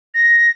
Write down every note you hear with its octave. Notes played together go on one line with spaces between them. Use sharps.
A#6